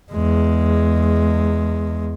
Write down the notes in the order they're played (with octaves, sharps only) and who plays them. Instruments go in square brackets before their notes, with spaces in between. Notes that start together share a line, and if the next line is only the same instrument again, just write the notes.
[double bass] E2 G#3